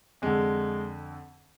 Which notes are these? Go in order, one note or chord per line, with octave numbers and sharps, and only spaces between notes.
F2 D3 G#3